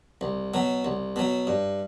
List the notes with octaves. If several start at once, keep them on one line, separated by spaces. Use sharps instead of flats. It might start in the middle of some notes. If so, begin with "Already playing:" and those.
C2
B2 F#3
C2
B2 F#3
G2